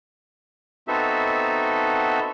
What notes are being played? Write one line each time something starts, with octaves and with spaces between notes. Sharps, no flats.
B3 C4 D#4 F#4 A4 E5